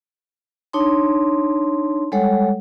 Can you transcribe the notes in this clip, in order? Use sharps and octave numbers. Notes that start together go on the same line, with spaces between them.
D4 D#4 C#5 A5 C6
G3 G#3 A4 C#5 F#5